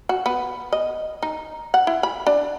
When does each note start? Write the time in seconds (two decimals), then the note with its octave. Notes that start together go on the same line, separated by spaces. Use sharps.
0.09 F#4
0.26 B3
0.73 D#5
1.23 D#4
1.74 F#5
1.87 E4
2.03 B5
2.27 D4